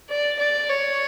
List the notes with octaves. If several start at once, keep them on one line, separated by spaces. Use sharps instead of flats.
D5
D5
C#5